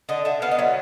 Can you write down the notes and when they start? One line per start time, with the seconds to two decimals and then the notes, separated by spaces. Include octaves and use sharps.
0.09 D3 D#5
0.25 D3 E5
0.42 B3 F5
0.51 D#5
0.59 F#3 E5